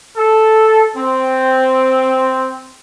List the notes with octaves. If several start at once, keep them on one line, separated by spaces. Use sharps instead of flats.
A4
C4